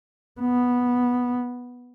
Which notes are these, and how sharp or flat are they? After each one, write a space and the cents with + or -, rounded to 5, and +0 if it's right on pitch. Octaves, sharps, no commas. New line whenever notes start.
B3 -5